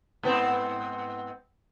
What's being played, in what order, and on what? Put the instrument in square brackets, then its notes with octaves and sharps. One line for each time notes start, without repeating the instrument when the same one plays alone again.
[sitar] G#2 B3 C4